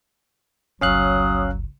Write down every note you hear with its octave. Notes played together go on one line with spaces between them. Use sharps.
G1 C#2 F#3 C#4 F5 D#6 F#6